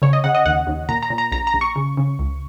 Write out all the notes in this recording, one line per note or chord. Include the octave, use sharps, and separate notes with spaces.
C#3 C#5
D#5
C#3 F#5
D#5
D#2 F#5
D#2
A#2 A#5
A#5
A#2
A#5
A#1 A#5
A#5
A#1
C#6
C#3
C#3
C#2